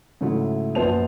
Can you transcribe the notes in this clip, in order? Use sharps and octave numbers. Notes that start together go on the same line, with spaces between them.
G#2 C#3 F#3 A3 E4
A#1 F#2 B3 C5 A5 F7